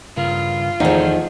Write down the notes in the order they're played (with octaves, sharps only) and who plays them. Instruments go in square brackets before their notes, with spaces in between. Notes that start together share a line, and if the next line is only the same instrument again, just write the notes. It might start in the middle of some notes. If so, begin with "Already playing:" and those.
[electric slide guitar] G2 C#3 A#4 [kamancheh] F4
[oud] E2 [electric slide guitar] D#3 A3 G#4 [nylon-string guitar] F3 D#4